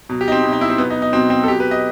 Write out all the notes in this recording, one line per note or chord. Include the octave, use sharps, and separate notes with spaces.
B2 F#3
G4
D#4
C4
B2 F#3
D#4
E4
C4
B2 F#3 B3
D#4
D#4
B2 F#3 C4
C4
A4
B2 F#3 G4
B4
D#5